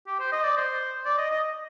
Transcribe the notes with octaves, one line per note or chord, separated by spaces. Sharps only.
G4
C5
D#5
D5
C5
D5
D#5
D#5